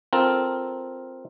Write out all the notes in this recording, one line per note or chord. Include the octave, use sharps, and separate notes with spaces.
C4 F4 A4 A#4